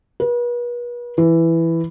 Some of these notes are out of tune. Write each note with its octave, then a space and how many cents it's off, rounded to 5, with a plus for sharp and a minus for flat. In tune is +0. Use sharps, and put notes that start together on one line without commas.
B4 -40
E3 +5